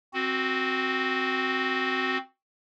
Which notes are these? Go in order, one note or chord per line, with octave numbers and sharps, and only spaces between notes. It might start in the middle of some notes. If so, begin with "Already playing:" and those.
C4 F#4